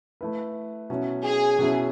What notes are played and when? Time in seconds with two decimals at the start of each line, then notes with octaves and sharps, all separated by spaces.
0.21 A3 E4 B4
0.90 B2 F#3 C#4 E4
1.24 G#4
1.58 B2 F#3 C#4 E4